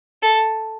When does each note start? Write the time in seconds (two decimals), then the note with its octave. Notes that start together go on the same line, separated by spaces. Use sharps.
0.22 A4